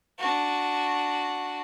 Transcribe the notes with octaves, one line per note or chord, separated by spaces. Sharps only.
D4 F#4